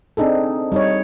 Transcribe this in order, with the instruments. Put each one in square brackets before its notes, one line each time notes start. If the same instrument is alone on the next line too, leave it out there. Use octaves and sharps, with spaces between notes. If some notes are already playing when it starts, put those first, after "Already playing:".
[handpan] C4 D4 D#4 G#4 A4
G3 D#4 C#5